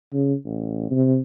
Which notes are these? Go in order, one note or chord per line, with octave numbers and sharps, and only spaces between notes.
C#3
A1
C3